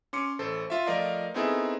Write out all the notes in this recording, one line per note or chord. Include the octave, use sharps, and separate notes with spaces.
C#4 C6 D6 C#7
A1 A4 C5
F4 E5
F3 A3 A#4 D5 D#5 F5
B3 C4 D#4 E4 G#4 A4